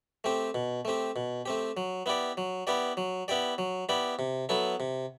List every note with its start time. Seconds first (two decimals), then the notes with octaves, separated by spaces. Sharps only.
0.24 A3 C4 G4
0.54 B2
0.85 A3 C4 G4
1.16 B2
1.46 A3 C4 G4
1.77 F#3
2.06 B3 E4 G4 D5
2.37 F#3
2.67 B3 E4 G4 D5
2.97 F#3
3.28 B3 E4 G4 D5
3.58 F#3
3.89 B3 E4 G4 D5
4.19 C3
4.49 F#3 B3 E4 A4
4.80 C3